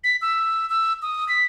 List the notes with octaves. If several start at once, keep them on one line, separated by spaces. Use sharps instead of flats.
B6
E6
E6
D#6
B6